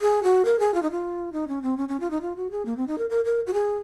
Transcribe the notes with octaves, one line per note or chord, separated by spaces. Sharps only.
G#4
F#4
A#4
G#4
F4
D#4
F4
D#4
C#4
C4
C#4
C#4
F4
D#4
F4
F#4
G#4
A#3
C4
D#4
A#4
A#4
A#4
F#4
G#4